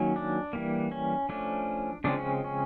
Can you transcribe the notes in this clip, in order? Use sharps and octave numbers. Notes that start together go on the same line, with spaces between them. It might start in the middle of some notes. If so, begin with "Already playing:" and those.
Already playing: D#3 F#3 A#3 C#4
D4
E3 G3 A#3
C#4
F3 A3 C#4 D4
C#3 F3 G#3 C4 D4
C#4
C#4